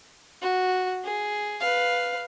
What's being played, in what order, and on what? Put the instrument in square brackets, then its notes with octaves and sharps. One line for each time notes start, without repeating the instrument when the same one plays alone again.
[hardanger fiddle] F#4
G#4
B4 F5